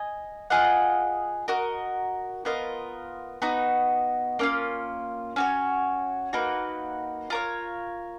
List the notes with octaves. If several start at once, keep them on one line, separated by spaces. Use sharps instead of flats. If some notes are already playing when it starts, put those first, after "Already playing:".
Already playing: D#5 G#5
F4 G#4 D#5 F#5
F#4 A#4 D#5
B3 F4 A#4 D#5
B3 D#4 F#4
A#3 C#4 F4
C#4 F#4 C#5
A#3 D#4 F#4 B4
F4 A#4 C#5